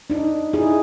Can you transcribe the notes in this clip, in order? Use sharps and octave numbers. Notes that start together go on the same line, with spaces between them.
D4 D#4
D#4 E4 G#4